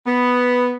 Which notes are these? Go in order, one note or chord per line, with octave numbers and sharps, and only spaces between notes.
B3